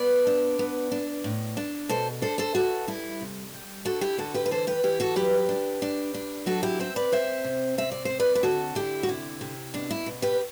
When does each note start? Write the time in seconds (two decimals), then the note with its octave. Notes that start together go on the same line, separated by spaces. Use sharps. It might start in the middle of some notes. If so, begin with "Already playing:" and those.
Already playing: B3 B4 D5
0.27 D4
0.59 B3
0.92 D4
1.24 A2
1.57 D4
1.89 B2 A4 C5
2.21 D4 A4 C5
2.38 A4 C5
2.55 E3 F#4 A4
2.88 G3 E4
3.21 C3
3.54 G3
3.85 D3 F#4 A4
4.01 E4 G4
4.18 D3 F#4 A4
4.34 G4 B4
4.46 B4
4.51 E3 A4 C5
4.67 G4 B4
4.83 E3 E4 G4
5.00 F#4 A4
5.16 F#3 G4 B4
5.49 D4
5.82 D4
6.14 D4
6.46 F#3 F#4 A4
6.63 E4 G4
6.79 C4 C5 E5
6.96 B4 D5
7.12 C4 C5 E5
7.44 C3
7.78 C4 E5
7.92 D5
8.05 C4 C5
8.20 B4 D5
8.35 B4
8.43 D3 F#4 A4
8.75 D3 E4 G4
9.03 F#4
9.09 C3 E4
9.41 C3
9.74 B2 D4
9.91 E4
10.06 B2
10.22 G4 B4